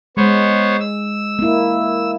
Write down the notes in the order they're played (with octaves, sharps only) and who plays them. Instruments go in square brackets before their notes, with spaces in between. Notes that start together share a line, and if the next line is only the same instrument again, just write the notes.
[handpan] G#3 [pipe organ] B3 C5 C#5
[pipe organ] E6
[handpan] A#3 E4